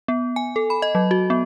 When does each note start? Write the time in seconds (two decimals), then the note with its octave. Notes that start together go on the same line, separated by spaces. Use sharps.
0.08 B3
0.36 G#5
0.56 A4
0.70 B5
0.82 D#5
0.95 F#3
1.11 F#4
1.30 B3